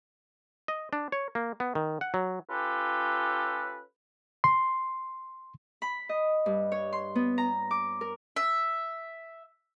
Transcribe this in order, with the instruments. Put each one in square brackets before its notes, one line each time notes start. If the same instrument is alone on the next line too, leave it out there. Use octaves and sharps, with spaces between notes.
[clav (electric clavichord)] D#5
D4
C#5
A#3
B3
D#3
F#5
F#3
[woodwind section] C#4 F4 G4 A4 B4
[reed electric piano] C6
[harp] B5
D#5
G2
C#5
C6
B3
A#5
D6
A#4
[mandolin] E5